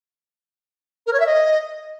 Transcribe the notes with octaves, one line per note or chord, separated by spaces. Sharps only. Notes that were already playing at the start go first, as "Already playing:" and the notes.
A#4
C#5
E5
D#5